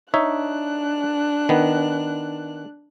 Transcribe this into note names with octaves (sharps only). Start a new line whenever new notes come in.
D4 D#4 C#5 E5 F#6
D#3 B3